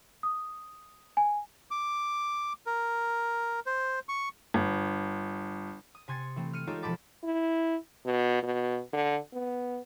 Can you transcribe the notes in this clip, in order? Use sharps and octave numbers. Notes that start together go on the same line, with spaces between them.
D#6
G#5
D6
A#4
C5
C#6
G1
D#6
C3 G#5 C6 G#6 A6 C#7
E3 A3 C4
F6 C#7 D#7
G#3 D#4 F4 G4 A4 C#5
E1 F3 A5 B5 D6 A6
E4
B2
B2
D3
B3